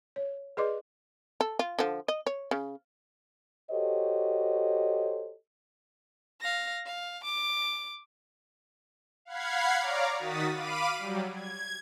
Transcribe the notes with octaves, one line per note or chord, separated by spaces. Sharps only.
C#5
G#4 B4 D5 D#5 C6 D6
A4
F4
D3 F3
D#5
C#5
C#3
F#4 G4 A4 C5 C#5 D#5
F5 A#6
F5
D6
F5 F#5 B5 G#6 C7
C#5 D5 F5 A#5 D6
D#3 F#4 D#6 A6 B6
F5 B5 D6 D#7
F#3 G3
G#6